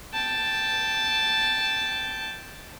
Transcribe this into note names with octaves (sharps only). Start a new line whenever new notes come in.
G5 A5